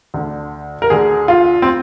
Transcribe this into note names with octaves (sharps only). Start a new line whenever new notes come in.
D2 D3
A#4
D2 D3 G#4
F4
C4